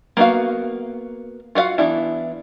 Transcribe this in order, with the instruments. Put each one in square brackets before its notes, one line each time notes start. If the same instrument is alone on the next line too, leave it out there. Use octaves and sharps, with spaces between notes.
[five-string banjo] A#3 B3 E4 F#4 F5
F4 F#4 C#5 F5 F#5
E3 B3 D4 E4